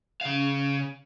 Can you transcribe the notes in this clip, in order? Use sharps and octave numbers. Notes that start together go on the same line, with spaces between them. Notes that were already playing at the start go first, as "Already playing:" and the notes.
C#3 F5